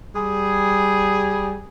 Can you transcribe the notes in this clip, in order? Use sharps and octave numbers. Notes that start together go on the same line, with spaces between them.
G3 G#4